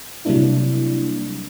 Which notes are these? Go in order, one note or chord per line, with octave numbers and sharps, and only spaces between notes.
C3 F#3 G3 A#3 D4 E4